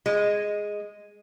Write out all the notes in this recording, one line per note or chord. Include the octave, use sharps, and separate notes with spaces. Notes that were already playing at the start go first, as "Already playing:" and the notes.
G#3